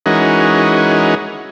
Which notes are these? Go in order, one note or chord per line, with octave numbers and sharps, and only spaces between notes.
E3 G#3 C#4 D#4 F#4 A#4